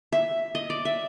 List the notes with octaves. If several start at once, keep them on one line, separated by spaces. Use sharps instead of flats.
E5
D#5
D5
E5